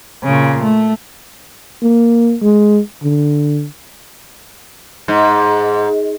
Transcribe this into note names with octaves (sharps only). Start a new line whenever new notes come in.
A#2 C#3
A3
A#3
G#3
D3
G#2